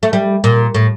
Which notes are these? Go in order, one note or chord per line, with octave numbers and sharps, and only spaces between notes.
A3
G3
A#2
A2